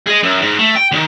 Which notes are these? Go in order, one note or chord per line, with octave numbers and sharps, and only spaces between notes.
G#4 D#5
F#2
G#2
A3
G5
D2 D#3